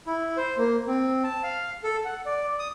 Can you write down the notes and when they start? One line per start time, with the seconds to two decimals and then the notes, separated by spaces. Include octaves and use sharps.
0.07 E4
0.37 C5
0.58 A#3
0.88 C4
1.24 A5
1.43 F5
1.84 A4
2.05 F#5
2.26 D5
2.59 D#6